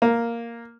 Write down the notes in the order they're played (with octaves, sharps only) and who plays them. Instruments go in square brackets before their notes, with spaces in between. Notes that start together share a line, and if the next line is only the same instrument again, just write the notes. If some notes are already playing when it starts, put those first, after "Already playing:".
[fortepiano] A#3